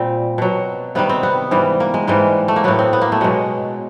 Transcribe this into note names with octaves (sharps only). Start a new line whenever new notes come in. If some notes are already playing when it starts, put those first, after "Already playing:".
Already playing: A#2 G3 C4
B2 F#3
C3 D#3 G3 B3
C4
B3
G#2 E3 G3
A#3
G#3
G#2 E3 G3 G#3
A3
A#3
A2 F#3 B3
C4
B3
A#3
A3
B2 F#3 G#3